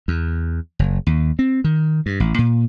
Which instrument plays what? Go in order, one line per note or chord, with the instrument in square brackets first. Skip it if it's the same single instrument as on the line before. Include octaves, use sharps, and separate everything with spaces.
[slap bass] E2
F#1
D#2
C4
D#3
G2
A1
A#2